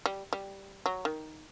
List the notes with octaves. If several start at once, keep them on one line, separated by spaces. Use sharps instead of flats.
G3
G3
F#3
D#3